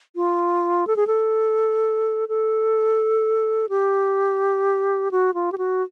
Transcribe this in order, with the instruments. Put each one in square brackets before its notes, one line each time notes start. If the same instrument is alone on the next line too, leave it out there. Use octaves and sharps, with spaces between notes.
[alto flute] F4
A4
G#4
A4
A4
G4
F#4
F4
G4
F#4